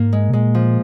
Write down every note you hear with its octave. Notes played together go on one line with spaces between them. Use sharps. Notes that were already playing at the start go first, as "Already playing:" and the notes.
Already playing: G#2 A#3
G#3
C3
A#2 G#3
F3